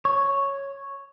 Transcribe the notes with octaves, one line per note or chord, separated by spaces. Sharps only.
C#5